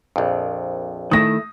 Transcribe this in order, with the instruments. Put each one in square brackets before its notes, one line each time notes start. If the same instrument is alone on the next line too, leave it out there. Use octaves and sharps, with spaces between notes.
[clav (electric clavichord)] A#1 F2
[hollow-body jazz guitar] D#3 A3 E4 [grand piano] D#6 A#6